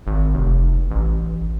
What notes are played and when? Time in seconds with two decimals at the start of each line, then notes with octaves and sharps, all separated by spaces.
0.07 G#1
0.34 F1
0.91 A1